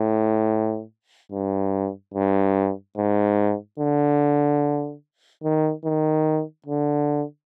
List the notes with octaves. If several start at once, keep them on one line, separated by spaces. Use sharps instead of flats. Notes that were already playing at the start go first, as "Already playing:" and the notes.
Already playing: A2
G2
G2
G#2
D3
D#3
D#3
D3